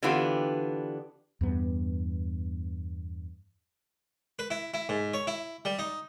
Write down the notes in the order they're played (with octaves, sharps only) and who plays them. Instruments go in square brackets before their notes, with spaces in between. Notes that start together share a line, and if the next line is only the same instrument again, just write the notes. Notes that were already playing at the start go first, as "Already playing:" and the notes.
[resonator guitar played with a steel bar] D3 E3 B3 D4 F4 G4
[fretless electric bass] E2 G2 B3
[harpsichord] B4
E4
E4
G#2
C#5
E4
G3
D#4